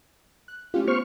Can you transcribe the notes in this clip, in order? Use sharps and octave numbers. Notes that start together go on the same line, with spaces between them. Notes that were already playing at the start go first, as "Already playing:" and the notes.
F#6
A3 C#4 F4 G4
B3 C5 C#6 F6